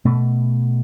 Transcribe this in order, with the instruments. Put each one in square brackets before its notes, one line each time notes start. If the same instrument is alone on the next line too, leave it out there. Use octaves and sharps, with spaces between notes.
[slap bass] B2 A3